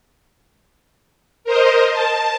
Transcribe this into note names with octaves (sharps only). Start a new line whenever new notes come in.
A#4 C5 D#5
A5